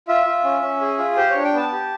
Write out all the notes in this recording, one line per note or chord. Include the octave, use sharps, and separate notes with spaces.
F4 E5
F4
C#4
C#4
G#4
F4
G4 C5
D4 C#5
G5
B3 A5
G4